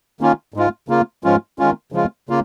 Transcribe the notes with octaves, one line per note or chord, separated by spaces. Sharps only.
D#3 A#3 C#4 F4
G#2 G#3 F4
C#3 A#3 F4
G#2 F3 G#3 C#4 F4
D#3 G#3 C#4 F4
C#3 F3 G#3 F4
C#3 A#3 F4